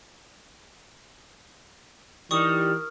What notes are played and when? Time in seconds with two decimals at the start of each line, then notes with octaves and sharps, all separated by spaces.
2.31 E3 G3 D#4 A#4 C#6 D#6